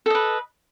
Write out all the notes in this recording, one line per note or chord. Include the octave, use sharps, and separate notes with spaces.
A4 B4 D#5